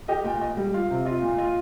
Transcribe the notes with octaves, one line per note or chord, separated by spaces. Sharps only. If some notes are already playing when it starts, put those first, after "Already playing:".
G4 D#5
A#2 G5
D#5
G3
F4 F5
C3
F4 D#5
A#2
F4 D#5